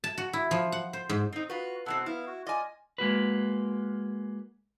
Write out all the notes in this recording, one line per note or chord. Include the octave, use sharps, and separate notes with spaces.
A5
F#4
E4
F3
F#5
C5
G#2
C4 D#4
F4 F#4 B4
B2 F#3 C4 E4 A4 F#5
B3 E4 F5
F#4
F4 D5 D#5 G#5
G#3 A#3 F#4 B4